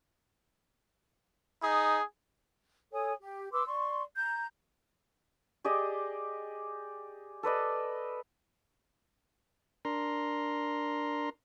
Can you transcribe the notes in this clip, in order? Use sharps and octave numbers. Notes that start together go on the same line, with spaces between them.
D#4 G#4
A4 C#5 G#5 D#6
G4
B4 C6 D6 E6
D5 C6 C#6
A#5 G6
G4 G#4 D5 D#5
A4 B4 D5 D#5
D4 A#4 A#5 C6